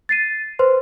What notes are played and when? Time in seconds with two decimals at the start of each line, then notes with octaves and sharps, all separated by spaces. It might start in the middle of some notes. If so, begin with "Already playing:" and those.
0.09 A6 C7 D#7
0.59 B4 C5 C6